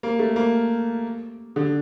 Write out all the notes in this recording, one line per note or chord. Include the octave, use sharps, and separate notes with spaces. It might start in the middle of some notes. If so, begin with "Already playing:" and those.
A#3
A3
A#3
D3